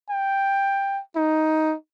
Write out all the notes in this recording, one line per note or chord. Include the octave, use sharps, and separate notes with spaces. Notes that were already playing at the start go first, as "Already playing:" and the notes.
G5
D#4